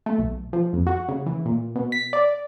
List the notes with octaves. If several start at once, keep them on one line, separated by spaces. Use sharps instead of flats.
A3
B1
F3
F2
F#4
C#3
E3
A#2
B2
B6
D5